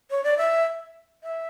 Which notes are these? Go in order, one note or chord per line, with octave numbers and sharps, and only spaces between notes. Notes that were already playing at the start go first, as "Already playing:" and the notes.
C#5
D5
E5
E5